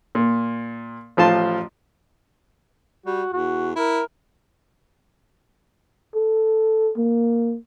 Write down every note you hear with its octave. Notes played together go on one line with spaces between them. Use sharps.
A#2
A1 F3 F4 A5 C6
G3 F#4
E2 F#4
E4 A#4
A4
A#3